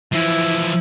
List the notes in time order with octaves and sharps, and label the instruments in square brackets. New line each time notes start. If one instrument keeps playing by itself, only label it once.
[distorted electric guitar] E3 F3 [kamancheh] E4